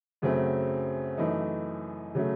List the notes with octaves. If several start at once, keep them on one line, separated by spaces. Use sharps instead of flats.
F#2 C#3 F#3 A3 C4
F#2 E3 A3 D#4
C#3 F#3 A3